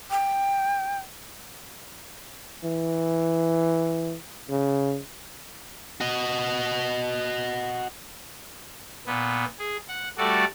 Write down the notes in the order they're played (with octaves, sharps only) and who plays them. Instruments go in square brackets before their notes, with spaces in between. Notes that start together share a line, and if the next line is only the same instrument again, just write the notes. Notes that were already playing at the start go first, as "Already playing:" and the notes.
[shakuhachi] G5
[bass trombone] E3
C#3
[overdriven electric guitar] F#4 D#5
[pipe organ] A#2 B3
G#4
F#5
G3 A3 F#4 A4 D5